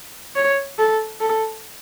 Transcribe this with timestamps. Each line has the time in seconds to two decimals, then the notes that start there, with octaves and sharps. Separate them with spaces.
0.36 C#5
0.78 A4
1.20 A4